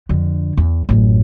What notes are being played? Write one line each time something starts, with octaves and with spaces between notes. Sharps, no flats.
F2 D3
E2
A1 F#2